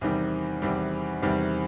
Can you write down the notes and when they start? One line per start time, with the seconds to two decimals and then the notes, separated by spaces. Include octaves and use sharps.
0.01 E2 C3 D#3 G3
0.62 E2 C3 D#3 G3
1.22 E2 C3 D#3 G3